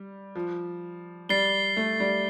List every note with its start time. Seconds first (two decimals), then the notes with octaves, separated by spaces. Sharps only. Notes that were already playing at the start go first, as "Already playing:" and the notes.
Already playing: G3
0.35 F3
1.29 G3 A6 C7 G7
1.77 A3
2.00 G3